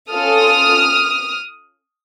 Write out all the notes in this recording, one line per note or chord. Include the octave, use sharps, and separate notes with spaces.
C#4 F4 A4 D#6 F6